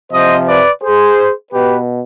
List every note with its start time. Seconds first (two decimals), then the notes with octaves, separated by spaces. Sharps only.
0.12 C3 F3 C5 D#5
0.48 B4 D5
0.83 G#4 C5
1.53 B2 G4 B4